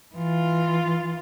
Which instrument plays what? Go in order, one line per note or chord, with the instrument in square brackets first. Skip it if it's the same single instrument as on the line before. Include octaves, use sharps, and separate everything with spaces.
[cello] E3 F4